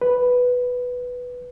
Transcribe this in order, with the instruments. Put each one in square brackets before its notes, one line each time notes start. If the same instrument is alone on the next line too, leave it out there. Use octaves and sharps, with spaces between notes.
[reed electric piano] B4